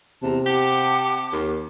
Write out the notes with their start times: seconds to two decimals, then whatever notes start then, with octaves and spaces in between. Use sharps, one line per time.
0.23 E2 C3 A5 A#5
0.46 G4 F#5 A5 D6
1.32 D#2